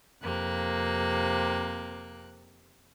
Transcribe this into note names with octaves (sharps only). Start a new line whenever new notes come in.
F2 C3 A#3 F#6